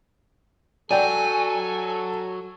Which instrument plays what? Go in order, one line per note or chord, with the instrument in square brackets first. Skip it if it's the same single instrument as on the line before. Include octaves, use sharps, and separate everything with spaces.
[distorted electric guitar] F#3 [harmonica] A4 [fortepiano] D5 G5 [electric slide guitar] G#5